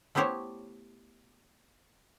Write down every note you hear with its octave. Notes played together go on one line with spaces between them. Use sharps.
A3 B3 E4 G4 C5 C#5